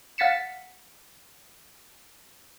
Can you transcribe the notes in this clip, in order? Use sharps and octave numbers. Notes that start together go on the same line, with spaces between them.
F5 F#5 A6 B6 C#7 E7